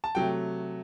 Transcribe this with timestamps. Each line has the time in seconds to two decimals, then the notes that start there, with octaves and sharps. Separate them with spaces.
0.04 A5
0.15 C3 F#3 A3 G5